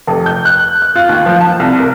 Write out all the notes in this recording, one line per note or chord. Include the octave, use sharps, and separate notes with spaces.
F1
G6
F#6
F#6
F4
D#2
F3
A5
C2
A#4